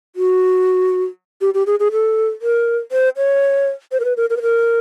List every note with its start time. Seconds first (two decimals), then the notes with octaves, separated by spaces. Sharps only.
0.16 F#4
1.41 G4
1.54 G4
1.67 G#4
1.80 G#4
1.92 A4
2.42 A#4
2.92 C5
3.17 C#5
3.92 C5
4.00 A#4
4.05 B4
4.17 A#4
4.30 A#4
4.37 B4
4.42 A#4